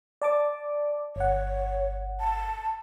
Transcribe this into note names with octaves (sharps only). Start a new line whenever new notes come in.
D5 A5 D6
G1 C#5 F#5
A5